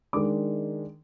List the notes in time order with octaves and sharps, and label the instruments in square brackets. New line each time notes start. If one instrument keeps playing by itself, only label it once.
[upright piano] D#3 G#3 D4 D6